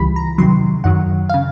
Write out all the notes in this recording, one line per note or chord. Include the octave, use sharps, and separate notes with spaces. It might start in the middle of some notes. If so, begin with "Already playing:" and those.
Already playing: C#2 C#3 E3 G3 B5
A#5
E2 C3 D#3 F#3 C6
F#2 D#3 F#3 F#5
C#3 F5